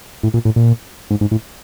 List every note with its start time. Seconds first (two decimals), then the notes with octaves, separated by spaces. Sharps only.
0.23 A2
0.34 A#2
0.45 A2
0.56 A#2
1.11 G#2
1.21 G#2
1.31 A2